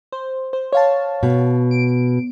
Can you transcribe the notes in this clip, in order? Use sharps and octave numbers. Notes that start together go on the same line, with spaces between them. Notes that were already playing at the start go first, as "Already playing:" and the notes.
C5
C5
C#5 F5 A5
B2
D7